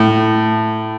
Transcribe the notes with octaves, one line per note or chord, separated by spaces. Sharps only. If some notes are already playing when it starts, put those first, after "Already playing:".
Already playing: A2